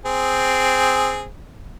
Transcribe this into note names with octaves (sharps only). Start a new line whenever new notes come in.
C4 G#4